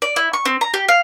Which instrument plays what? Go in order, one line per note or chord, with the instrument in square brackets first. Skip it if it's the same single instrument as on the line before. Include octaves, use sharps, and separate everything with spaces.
[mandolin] D5
E4
C#6
C4
A#5
G4
F5